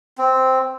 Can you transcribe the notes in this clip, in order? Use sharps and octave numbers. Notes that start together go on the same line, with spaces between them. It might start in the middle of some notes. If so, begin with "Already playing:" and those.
C4